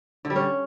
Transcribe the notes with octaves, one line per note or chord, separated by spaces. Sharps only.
D3
G3
C#4